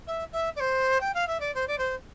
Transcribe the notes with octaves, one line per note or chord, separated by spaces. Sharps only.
E5
E5
D5
C5
G5
F5
E5
D5
C5
D5
C5